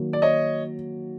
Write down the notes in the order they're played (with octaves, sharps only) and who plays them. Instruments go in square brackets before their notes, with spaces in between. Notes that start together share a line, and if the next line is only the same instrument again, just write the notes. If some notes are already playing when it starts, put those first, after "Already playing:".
Already playing: [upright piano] D#3 F#3 A#3
[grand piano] D5
C#5 D#5